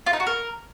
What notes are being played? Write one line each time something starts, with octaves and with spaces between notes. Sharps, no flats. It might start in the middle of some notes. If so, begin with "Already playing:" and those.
F4
D#4
F#4
A#4